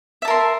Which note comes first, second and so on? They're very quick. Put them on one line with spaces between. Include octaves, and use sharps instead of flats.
E5 A5 A#4 C6